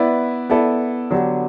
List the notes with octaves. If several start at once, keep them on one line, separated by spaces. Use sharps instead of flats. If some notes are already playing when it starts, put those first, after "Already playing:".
Already playing: B3 E4 B4 D5
B3 E4 A4 D5
D3 F#3 B3 D4 G4